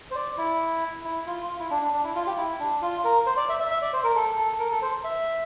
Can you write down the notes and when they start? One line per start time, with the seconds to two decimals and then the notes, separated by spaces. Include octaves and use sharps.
0.11 C5
0.16 D5
0.38 E4
1.05 E4
1.27 F4
1.49 F4
1.60 E4
1.71 D4
1.82 D4
1.93 D4
2.04 E4
2.15 F4
2.27 G4
2.38 E4
2.60 D4
2.82 F4
3.04 A#4
3.26 C5
3.37 D5
3.49 E5
3.60 E5
3.71 E5
3.82 D5
3.93 C5
4.04 A#4
4.16 A4
4.38 A4
4.59 A#4
4.71 A4
4.82 C5
5.04 E5